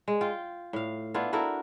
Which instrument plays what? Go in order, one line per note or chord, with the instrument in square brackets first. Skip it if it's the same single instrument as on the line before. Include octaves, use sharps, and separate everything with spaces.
[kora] G#3
F4 G5
A2 F5
B3 D4 E4 F4
E4 F#4 A4 A#4